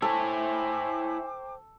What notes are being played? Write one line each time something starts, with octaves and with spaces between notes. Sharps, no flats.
E4 A4 C5 C#5 G5 G#5 D6